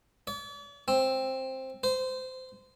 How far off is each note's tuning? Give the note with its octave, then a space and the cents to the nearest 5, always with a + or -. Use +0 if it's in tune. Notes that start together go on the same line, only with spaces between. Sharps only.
D5 -45
C4 +10
C5 -25